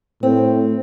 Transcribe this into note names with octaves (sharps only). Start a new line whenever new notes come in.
A2 C4